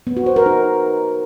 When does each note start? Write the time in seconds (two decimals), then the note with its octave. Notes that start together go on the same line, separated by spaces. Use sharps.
0.07 B3
0.17 F#4
0.26 C5
0.36 A#4
0.46 D#4